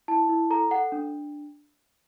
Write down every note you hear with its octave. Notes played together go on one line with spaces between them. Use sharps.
E4 A5
E4
A4 A#5
A4 F#5
D4